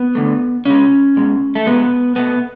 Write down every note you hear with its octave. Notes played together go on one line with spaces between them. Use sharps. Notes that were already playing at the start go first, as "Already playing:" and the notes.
Already playing: B3
D3 A3
C#3 G#3 C#4
B2 G#3
A3
B2 G#3 B3
B2 A3 B3